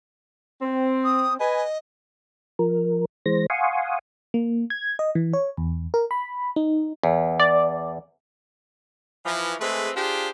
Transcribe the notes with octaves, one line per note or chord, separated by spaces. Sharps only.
C4
D#6
B4 D#5 G#5
F3 A#4
E3 G#3 C5 A#6
F5 F#5 G#5 C6 C#6 D#6
A#3
G#6
D#5
E3
C#5
E2
A#4
B5
D#4
E2
D5
E3 F3
G#3 A3 C4 G#4 B4
D4 F4 G4 G#4 C5